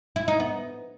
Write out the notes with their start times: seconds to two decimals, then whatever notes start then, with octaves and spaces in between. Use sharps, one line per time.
0.16 E4
0.28 D#4
0.40 B3